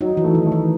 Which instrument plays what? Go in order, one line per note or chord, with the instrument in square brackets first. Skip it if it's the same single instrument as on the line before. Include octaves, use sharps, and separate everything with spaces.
[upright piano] F#3 [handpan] D#4
[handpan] E3
[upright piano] A3
[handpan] D#3
[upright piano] A3
[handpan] E3